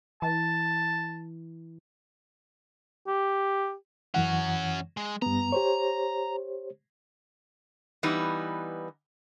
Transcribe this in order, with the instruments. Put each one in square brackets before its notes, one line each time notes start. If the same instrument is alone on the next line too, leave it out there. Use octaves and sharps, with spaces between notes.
[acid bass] E3 [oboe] A5
[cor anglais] G4
[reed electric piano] F#2 E3 F#5 [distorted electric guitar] C#4 F#4
[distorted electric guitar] G#3
[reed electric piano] G2 B3 [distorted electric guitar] A#5
[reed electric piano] G4 C5 C#5
[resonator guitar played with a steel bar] E3 G3 B3 D#4 B4